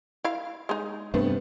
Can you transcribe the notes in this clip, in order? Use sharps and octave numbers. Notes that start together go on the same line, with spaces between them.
E4 F5
G#3 D#4
G2 C3 A3 B3